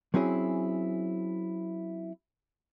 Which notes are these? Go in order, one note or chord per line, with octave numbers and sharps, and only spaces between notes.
F#3 C4 C#4 E4 G#4